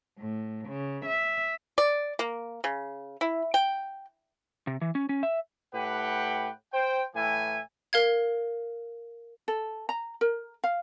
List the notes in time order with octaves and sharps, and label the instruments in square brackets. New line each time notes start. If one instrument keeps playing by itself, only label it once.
[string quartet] A2
C#3
E5
[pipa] D5
A#3
C#3
E4
G5
[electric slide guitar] C3
E3
C#4
C#4
E5
[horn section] A2 G4 B4 F#5 G5
C5 G5
A2 E3 E5 G5 G#5
[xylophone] A#4 F5 G#6
[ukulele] A4
A#5
A#4
F5